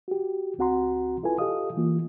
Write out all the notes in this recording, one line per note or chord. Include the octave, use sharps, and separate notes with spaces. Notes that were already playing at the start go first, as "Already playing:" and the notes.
F#4 G4
C#2 C4 F#4 F#5 A#5 C6
E4 F4 A4 B4 G#5
F4 G4 A4 D#5 F5 D#6
E3 A#3 F4